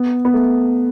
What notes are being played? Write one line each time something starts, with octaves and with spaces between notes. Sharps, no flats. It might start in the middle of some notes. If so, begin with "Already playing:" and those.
Already playing: B3
B3
A3